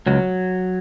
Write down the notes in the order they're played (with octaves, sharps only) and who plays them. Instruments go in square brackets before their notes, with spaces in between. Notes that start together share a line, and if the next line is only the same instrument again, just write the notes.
[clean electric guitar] C#2 [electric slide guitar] F#3